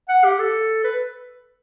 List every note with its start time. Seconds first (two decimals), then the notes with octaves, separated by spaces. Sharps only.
0.09 F#5
0.25 G4
0.39 A4
0.84 B4